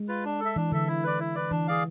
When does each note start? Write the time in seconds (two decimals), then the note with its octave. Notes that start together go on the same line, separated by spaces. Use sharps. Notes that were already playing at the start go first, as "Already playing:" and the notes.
Already playing: G#3
0.08 F4 B4
0.25 D4
0.40 A4
0.45 E5
0.56 E3 D4
0.72 D3 A4 E5
0.88 E4
1.04 B4 D5
1.20 E4
1.35 B4 D5
1.51 E3 D4
1.68 G#4 D5 F5